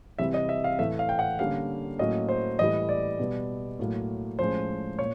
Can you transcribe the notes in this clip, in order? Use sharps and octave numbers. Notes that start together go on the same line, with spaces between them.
C3 E3 G3 E5
D#5
E5
F5
A2 E3 A3 E5
F5
G5
F#5
D3 G3 A#3 C#4 F5
A2 F#3 A#3 C#4 D#5
C5
A2 E3 G3 D#5
D5
B2 G3 B3
A2 F#3 A#3
A2 F3 G#3 C#4 C5
A#2 C#5